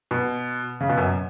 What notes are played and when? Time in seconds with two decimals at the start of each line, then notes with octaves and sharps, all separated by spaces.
0.11 B2
0.81 C#3
0.89 B2
0.98 F#2